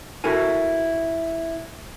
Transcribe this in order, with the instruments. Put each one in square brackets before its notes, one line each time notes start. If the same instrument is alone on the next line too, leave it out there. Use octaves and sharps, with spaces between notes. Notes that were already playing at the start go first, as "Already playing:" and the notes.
[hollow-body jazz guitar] E4 F#4 A4 A#4 G#5